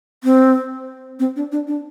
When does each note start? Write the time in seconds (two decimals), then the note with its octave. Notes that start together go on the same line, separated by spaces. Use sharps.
0.24 C4
1.19 C4
1.36 D4
1.52 D4
1.67 D4